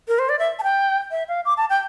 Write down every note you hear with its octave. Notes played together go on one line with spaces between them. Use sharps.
A#4
C5
D5
E5
A5
G5
E5
F5
D6
A5
G5